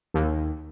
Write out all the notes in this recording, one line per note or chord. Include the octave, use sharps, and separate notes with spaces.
D#2